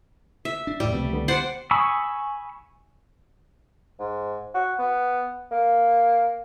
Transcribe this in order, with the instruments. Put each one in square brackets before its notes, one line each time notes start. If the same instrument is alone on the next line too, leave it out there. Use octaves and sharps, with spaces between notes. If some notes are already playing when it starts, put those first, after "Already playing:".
[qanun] E5
[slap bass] D4
[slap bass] F2 A2 [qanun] G3 [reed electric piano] D5 E6
[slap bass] C#2 F3 A3 [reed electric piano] C3 B3
[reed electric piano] D3 B3
[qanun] C5 D5 F#5
[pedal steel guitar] G#5 B5 C#6 D#6 E6
[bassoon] G#2
F#4
B3
A#3